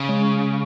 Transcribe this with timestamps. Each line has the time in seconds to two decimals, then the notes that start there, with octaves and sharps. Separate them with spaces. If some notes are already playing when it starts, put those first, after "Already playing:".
Already playing: C#3
0.09 G#3 C#4